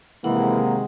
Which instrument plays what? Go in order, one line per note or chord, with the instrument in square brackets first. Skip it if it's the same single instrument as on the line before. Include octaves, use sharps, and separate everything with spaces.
[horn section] C3 D#3 G#3 [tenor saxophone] E3 [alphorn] A#3 [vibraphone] F#5